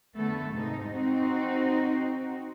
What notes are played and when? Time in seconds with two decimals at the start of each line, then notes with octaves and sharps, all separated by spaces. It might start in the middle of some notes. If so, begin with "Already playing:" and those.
0.17 D3 A3 B3 A4
0.53 G#2 C3 D#4
0.88 C4 D#4 F#4